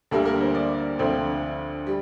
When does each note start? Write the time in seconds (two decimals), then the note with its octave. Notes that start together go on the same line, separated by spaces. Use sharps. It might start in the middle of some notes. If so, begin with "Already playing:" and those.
0.11 D2 D3 G3 A#3 A4
0.25 A#4
0.41 C5
0.55 D5
0.99 D2 D3 F3 C4
1.87 G3